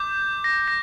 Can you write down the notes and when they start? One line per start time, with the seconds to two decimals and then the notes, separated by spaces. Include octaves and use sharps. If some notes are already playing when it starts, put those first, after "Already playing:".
Already playing: D6 G6
0.44 A#6
0.68 A#6